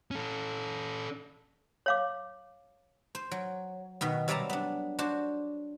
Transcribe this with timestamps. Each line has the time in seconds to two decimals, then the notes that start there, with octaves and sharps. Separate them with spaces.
0.11 C#4 A4
1.86 C#5 F5 D6
3.15 C5
3.31 F#3
4.01 B2 D#3 B3
4.28 C3 F#3 G3 D5 A5 A#5
4.50 B3 D4
4.99 D4 F#4 C5